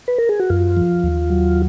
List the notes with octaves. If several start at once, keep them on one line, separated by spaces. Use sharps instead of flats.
B4
A#4
G#4
F#4
F#2 F4
F3
D#2
F#3